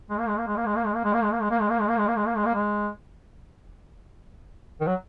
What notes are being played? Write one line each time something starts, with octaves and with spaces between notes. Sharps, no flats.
G#3
A#3
G#3
A#3
G#3
A#3
G#3
A#3
G#3
A#3
G#3
A#3
G#3
A#3
G#3
A#3
G#3
A#3
G#3
A#3
G#3
A#3
G#3
A#3
G#3
A#3
G#3
D#3
F#3